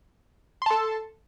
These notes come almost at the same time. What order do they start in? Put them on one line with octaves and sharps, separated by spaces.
C6 A5 A4